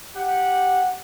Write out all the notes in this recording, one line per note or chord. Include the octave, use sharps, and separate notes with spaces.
G4 F#5